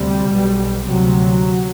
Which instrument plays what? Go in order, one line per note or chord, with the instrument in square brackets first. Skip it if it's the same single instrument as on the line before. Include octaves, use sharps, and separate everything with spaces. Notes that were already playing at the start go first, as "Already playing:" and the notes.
Already playing: [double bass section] D2 C3 G3
B1 B2
D2 C3 F#3